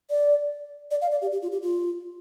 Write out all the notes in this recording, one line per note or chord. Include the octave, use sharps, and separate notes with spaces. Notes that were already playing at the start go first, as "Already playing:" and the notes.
D5
D5
F5
D5
G4
G4
F4
G4
F4